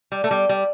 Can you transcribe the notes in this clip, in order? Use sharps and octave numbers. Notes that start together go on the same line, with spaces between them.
G3
A3
G3
G3